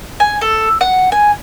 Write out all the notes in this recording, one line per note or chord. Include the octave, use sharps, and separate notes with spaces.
G#5
A4
F#5
G#5